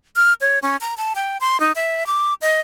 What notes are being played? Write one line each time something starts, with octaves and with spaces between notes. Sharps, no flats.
F6
C#5
C#4
A#5
A5
G5
C6
D#4
E5
D6
D#5